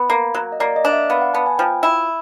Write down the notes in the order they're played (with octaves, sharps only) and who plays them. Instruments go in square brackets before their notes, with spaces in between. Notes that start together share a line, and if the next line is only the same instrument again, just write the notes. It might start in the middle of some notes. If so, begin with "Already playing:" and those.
Already playing: [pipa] B3
A#3
F#3
[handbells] D#5
[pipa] A#3 [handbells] D5
[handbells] D#5
[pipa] D4
[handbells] E5
[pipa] B3 [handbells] F5
[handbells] F#5
[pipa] B3 [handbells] A5
[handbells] G#5
[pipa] F3 [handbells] G5
[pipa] E4